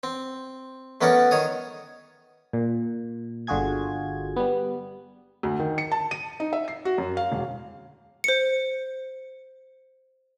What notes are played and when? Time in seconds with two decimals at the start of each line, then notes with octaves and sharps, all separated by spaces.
0.03 C4
1.01 A3 B3 C#4 A#4 D5 F#5
1.31 D#3 C#5 D#6
2.53 A#2
3.47 G1 D3 F4 F#4 G#4 G#6
4.36 G3 B3
5.43 D2
5.60 D#3
5.78 C#7
5.92 A5
6.11 D#7
6.40 D#4
6.53 E5
6.68 C7
6.85 F#4
6.98 F#2
7.17 F5
7.32 E1
8.24 C5 C#7